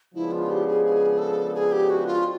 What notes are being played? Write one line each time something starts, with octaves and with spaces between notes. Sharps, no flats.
C#3 F3 G#3 B3 D4 E4
F4
G4
G#4
G#4
A4
G#4
G4
F#4
F4